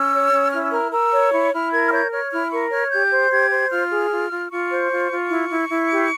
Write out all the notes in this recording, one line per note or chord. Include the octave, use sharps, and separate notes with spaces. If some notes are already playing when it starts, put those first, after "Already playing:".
Already playing: C#4 E6
C#5
C#4
E4 F6
E6
A#4 F6
A#4 E6
C#5
E4 C#6
E4 F6
A#4 G#6
F6
C#5 G6
C#5 F6
E4 F6
A#4 C#6
C#5 F6
G4 G6
C5
G4 G#6
C5
F4 F6
G#4
F4
F4
F4 C#6
C5
F4
F4
E4
E4
E4
G4